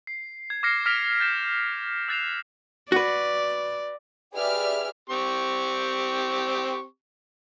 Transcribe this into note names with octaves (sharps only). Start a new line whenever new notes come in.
C7
G#6
D6 F6 A#6 C7 C#7 E7
F6 A#6 B6 D7 F7
G6 A6 E7
E6 F#6 A6 C7 E7 F7
F#4 B4 D5
G4 G#4 B4 D5 E5 F6
C4 G4 C#6